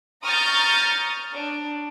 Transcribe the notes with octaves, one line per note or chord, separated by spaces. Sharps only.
A#5 C#6 D#6 F6 G6 A6
D4